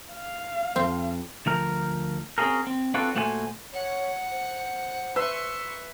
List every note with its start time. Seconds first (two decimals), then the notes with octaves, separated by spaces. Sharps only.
0.13 F5
0.76 F2 C4
1.46 D2 F3 A#4
2.38 C4 C#4 F4 F#4 G#4 A#4
2.67 C4
2.94 C4 D4 F4 F#4 A4 B4
3.15 A#2 A3 F#4 C5 C#5 G#5
3.73 C#5 F#5
4.31 C5
5.16 B4 E5 C6 C#6